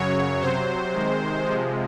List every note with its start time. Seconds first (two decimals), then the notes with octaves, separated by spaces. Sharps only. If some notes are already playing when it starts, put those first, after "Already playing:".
Already playing: F#2 C#3 F#3 C#5
0.40 C3 F#3 C5
0.93 C3 D#3 G#3
1.44 C3 F3 G#3